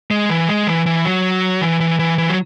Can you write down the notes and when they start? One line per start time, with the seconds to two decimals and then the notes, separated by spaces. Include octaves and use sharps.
0.11 G#3
0.30 E3
0.48 G#3
0.67 E3
0.86 E3
1.05 F#3
1.62 E3
1.80 E3
1.99 E3
2.18 E3
2.30 F#3